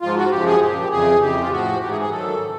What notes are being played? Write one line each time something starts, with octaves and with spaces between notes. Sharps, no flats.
G#2 F3 F4
F#4
F#2 C#3 F3 G4
G#4
A#2 F3 G4
F2 C#3 E3 G#4
F2 C#3 E3 G4
F4
A2 F3 F#4
G#2 E3 G4
G#4
G#4
G#2 D#3 F#3 A4
C#3 E3